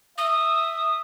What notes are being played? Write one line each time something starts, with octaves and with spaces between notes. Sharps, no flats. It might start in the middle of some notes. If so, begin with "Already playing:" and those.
E5 D#6